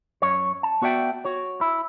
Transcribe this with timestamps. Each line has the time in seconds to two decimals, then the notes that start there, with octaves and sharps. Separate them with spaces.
0.22 F#2 C#5
0.63 A5
0.82 B3 F#4 D5 E5 G5
1.25 F#4 C#5
1.61 E4